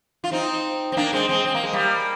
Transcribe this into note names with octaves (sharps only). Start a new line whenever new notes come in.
F4
C4 D#4
C4
A#3 D4
G#3 C4
G#3 C4
C4
A#3
G#3
G3 A#3